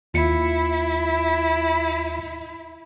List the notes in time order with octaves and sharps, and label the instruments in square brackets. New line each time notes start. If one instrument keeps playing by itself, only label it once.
[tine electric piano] D#2 F4 C#7 [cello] E4